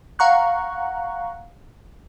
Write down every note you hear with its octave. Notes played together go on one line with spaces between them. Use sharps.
F5 F#5 A#5 C#6 F#6